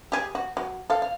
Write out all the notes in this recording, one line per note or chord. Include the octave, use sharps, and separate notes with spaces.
G4 G#4
F#4
F#3
A4 F5
F5